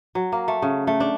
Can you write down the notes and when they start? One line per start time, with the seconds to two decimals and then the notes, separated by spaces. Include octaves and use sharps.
0.15 F#3
0.32 A#3
0.48 A3
0.62 C#3
0.87 A3
1.00 D4